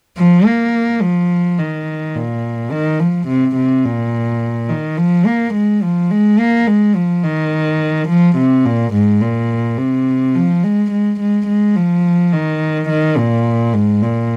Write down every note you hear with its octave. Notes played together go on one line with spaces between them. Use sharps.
F3
A#3
F3
D#3
A#2
D#3
F3
C3
C3
A#2
D#3
F3
A#3
G#3
F3
G#3
A#3
G#3
F3
D#3
F3
C3
A#2
G#2
A#2
C3
F3
G#3
G#3
G#3
G#3
F3
D#3
D#3
A#2
G#2
A#2